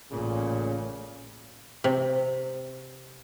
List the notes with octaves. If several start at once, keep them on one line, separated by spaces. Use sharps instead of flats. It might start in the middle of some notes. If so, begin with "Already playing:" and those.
A1 A#2 C#3
C3